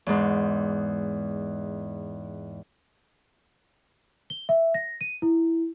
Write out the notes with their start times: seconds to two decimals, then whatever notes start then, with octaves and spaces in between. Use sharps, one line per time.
0.06 E2 G#2
4.30 G7
4.49 E5
4.74 A#6
5.01 D#7
5.22 E4